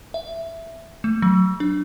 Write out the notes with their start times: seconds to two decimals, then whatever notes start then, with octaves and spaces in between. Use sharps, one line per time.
0.14 E5
1.04 A3
1.22 F#3
1.60 D4